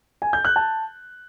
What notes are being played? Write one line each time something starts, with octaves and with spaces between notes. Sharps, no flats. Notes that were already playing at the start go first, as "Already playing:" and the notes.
G#5
G6
F#6
A5